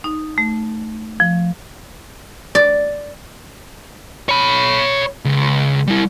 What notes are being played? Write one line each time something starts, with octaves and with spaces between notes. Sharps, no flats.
D#4
A3
F3
D5
C#5 B5
C#2
G3 E4